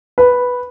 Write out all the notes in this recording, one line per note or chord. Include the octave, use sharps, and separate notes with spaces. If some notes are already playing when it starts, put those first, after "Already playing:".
B4